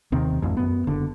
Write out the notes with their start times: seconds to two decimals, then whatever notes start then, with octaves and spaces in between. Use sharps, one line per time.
0.12 D#2 C3 D#3 C4
0.42 A1 F2
0.57 F#2 B3
0.87 F#1 D3